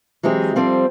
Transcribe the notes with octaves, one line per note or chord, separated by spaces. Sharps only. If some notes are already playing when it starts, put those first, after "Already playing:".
E3 F#3 G#3 C4 G4 G#4
F3 G3 C4 A4 C5